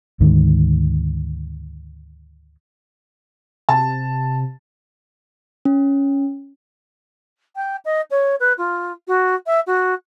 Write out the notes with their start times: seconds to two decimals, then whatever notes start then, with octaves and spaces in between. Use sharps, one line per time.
0.20 D2 G#2 D#3
3.69 C3 A5
5.65 C#4
7.56 G5
7.85 D#5
8.10 C#5
8.40 B4
8.58 F4
9.07 F#4
9.46 E5
9.67 F#4